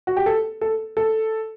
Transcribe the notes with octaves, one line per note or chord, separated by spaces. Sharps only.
F#4
G4
A4
A4
A4